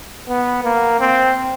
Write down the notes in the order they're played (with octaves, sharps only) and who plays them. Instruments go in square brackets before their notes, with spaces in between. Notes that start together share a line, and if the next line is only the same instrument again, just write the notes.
[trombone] B3
A#3
C4